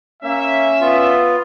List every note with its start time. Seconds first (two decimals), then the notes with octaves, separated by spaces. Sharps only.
0.23 A#3 C#4 E5
0.81 B3 F4